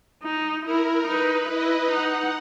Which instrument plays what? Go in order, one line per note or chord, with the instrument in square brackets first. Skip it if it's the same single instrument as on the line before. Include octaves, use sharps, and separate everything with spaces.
[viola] D#4
[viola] E4 [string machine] A#4
[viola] D#4 [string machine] B4
[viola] E4 [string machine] D#5
[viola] D#4 [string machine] F#5